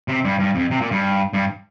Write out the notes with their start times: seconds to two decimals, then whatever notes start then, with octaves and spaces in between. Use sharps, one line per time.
0.08 C3
0.24 G2
0.39 G2
0.55 F2
0.71 C3
0.81 A#2
0.91 G2
1.33 G2